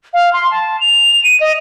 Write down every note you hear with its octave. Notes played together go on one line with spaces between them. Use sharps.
F5
C6
A5
F7
D#7
D#5